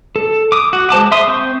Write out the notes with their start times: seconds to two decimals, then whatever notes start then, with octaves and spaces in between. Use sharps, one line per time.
0.16 A4
0.52 D6 D#6
0.73 F#4
0.90 G#3 C5 A5 D6
1.12 E5 C6 D#6
1.28 C4 C#6 G6